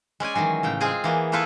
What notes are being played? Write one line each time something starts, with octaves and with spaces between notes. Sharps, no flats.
G#3 C#4 D5 G#5
D#3 E3 F#3 G#3
A2 C#3 G5
G#3 C4 F4 G#4 G#5
E3 A#3 B3
A3 B3 E4 F4 A4 B4